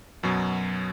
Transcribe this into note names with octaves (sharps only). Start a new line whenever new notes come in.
F#2 B2 F#3